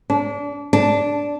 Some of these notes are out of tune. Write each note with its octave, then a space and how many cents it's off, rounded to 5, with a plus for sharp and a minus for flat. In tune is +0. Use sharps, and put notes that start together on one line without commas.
D4 -30
D4 -10